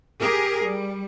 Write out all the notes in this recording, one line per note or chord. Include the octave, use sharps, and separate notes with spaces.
G4 G#4 A#4
G3